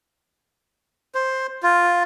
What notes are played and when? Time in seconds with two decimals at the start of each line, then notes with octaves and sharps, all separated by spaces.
1.15 C5
1.63 F4